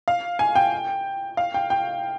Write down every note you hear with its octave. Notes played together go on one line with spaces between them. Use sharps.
F5
G#5
G5
F5
G5
G5